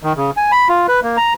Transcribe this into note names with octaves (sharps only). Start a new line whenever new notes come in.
D#3
C#3
G#5
B5
F4
B4
A#3
A#5